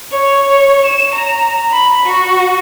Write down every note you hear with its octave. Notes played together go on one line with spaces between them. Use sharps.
C#5
E7
A#5
B5
F#4